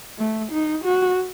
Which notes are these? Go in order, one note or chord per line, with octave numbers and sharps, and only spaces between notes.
A3
D#4
F#4